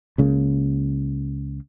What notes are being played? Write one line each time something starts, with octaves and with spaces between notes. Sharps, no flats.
C#2 C#3 A#3